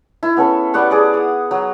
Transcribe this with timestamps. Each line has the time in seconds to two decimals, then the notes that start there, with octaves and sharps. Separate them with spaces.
0.23 E4
0.37 B3 C#4 A4
0.74 G3 B3 F#5 C#6
0.91 G#4 D5
1.14 D#6
1.51 F#3